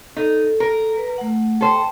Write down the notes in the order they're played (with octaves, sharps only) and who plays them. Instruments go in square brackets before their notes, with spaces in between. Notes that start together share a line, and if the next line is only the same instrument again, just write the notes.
[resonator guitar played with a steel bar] D#4 [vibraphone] A4
[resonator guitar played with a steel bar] A#4
[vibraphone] B4
A3 F#5
[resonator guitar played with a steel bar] A4 C5 [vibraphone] G5 A5